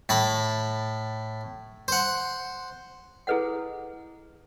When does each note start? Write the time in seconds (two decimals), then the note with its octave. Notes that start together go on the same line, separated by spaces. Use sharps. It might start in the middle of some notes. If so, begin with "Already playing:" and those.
0.09 A2 A5 B5
1.88 C5 F#5
3.27 E4 G#4 A4 B4 D#5 F#5